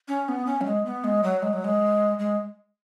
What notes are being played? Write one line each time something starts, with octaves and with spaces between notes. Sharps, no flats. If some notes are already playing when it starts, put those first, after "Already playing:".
C#4
B3
C#4
F#3
G#3
B3
G#3
F#3
G#3
F#3
G#3
G#3